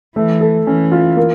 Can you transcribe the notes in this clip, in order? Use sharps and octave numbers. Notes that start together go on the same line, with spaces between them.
E3 A3
A4
E3 C#4
F4
A#3